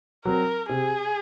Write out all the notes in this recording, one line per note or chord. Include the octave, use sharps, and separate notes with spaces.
F#3 C4 A#4
C3 G#4